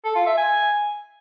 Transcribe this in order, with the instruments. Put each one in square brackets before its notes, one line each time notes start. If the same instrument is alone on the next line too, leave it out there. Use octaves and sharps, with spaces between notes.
[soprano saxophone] A4
F4
E5
G#5